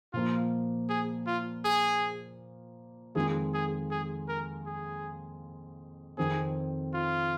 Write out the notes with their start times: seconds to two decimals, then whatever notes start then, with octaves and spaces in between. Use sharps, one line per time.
0.13 A#2 F3 A#3 F4
0.89 G#4
1.27 F4
1.65 G#4
3.15 F2 D#3 G#3 F4 G#4
3.54 G#4
3.91 G#4
4.28 A#4
4.66 G#4
6.18 F2 D#3 C4 G#4
6.94 F4